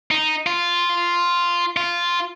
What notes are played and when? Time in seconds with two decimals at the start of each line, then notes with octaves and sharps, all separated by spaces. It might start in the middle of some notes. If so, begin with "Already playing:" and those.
0.11 D#4
0.46 F4
1.76 F4